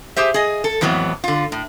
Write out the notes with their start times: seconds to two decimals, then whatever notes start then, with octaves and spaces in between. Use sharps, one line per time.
0.16 G4 G#4 C5 E5
0.34 G#4 D#5
0.64 A4
0.81 F2 A2 E3 F#3 B3
1.24 D3 F4
1.52 A2